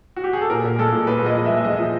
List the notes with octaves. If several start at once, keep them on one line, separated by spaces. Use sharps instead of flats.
F#4
G4
G#4
A4
A#2 A#4
A#2
G#3 A4
A#2
A#2 B4
G#3 D#5
F3
E5
G#3
E5
G#3 D#5
F3